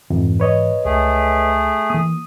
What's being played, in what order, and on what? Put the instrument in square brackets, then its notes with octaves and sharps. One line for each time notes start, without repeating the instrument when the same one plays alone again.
[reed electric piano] F2 [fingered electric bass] G#2 E3
[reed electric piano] B4 C#5 D#5
[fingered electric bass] C#2 [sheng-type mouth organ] A3 G#4
[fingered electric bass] E3 A#3 [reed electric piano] D#6